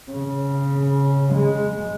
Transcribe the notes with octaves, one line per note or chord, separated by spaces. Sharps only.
C#3
G#3